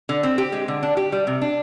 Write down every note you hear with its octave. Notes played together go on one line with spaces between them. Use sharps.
D3
C4
G4
G#3
D3
D4
G4
G3
C3
D4